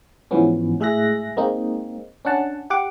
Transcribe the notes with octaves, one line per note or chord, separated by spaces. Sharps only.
G#2 E3 F3 B3 C#4
A2 G#3 G#4 E5 F#6 A#6
G#3 A#3 C4 D#4
C#4 D4 F#5 A5
G4 F#5 D6